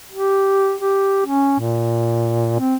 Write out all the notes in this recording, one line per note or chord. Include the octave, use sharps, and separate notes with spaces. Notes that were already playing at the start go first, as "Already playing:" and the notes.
G4
G4
C#4
A#2
C4